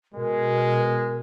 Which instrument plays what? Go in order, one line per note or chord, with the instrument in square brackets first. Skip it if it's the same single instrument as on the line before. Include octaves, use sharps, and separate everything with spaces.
[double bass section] B2 [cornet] G#3 [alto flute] A#4